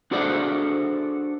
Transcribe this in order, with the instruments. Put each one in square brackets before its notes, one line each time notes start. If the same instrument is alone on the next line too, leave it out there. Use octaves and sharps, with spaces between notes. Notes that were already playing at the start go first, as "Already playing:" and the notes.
[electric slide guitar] D4 F#4 G#4 A4 C5 D5